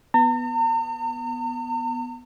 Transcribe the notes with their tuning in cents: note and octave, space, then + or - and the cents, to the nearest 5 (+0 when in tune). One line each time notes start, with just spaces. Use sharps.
B3 +0 A#5 -45